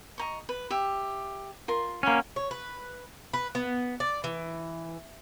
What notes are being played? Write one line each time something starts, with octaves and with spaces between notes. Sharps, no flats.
D#5 A#5 C#6
B4
G4 E5
F4 A#4 C6
A#3 C#4 F#4 B5
C#5
B4
B4
B3
D5
E3